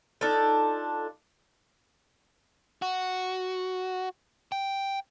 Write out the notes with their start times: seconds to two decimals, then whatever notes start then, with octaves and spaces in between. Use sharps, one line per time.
0.21 D4 D#4 F4 A4
2.82 F#4
4.52 G5